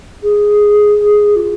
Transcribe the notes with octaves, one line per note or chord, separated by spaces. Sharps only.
G#4
F4